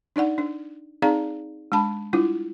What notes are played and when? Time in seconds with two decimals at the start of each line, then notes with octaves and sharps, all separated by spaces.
0.16 D4 D#4 D5 F#5
0.38 D4
1.02 C4 D#4 G#4 D5 F5 A#5
1.72 G#3 D4 A5 B5
2.13 G3 D4 E4 F4